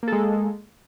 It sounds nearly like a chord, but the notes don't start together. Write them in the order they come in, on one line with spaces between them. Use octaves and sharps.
A#3 A4 G#3